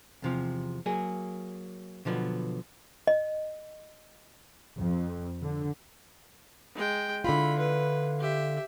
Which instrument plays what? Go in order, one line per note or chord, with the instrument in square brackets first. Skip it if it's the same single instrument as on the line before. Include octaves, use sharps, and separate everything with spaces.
[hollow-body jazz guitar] E2 C3 F3
F#3 A#3 G#4
B2 D3 F3 F#3 B3
[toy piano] D#5
[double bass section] F2
D3
[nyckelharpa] G#3 G5
[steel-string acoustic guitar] D3 E4 F4 [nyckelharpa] B5
[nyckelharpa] B4
G4 E5